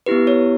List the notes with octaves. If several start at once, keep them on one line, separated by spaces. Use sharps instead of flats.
B3 E4 G4 B4
C#5